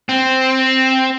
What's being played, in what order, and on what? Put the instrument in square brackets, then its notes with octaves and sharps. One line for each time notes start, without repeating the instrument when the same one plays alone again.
[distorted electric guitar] C4